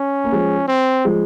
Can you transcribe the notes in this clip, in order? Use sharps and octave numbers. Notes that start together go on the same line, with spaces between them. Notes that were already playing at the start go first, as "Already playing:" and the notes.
Already playing: C#4
A#3
F3 G#3
C4
F3 G#3